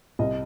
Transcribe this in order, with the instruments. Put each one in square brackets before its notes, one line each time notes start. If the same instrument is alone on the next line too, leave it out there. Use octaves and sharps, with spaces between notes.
[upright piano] C2 [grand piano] D#5